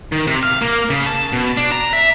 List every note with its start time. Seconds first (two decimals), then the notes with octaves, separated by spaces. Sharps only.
0.12 D#3
0.27 C3
0.43 F5
0.62 A#3
0.90 C#3
1.06 A5
1.33 B2
1.57 D4
1.72 A#5
1.93 E5